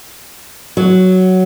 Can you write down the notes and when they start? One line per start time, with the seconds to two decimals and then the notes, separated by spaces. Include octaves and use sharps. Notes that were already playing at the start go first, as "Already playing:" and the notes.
0.77 F#3